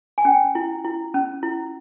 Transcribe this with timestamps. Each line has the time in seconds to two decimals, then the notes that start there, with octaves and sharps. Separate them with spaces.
0.18 G#5
0.25 C#4 G5
0.55 E4
0.85 E4
1.14 C#4
1.43 E4